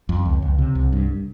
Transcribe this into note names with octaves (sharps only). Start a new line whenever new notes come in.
F2
C#2
C#2
C3
C2
G2